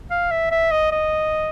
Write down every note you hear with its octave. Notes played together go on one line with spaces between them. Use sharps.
F5
E5
E5
D#5
D#5